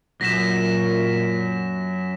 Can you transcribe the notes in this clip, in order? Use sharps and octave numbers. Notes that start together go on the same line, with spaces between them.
F#2 A#2 A#6 B6 E7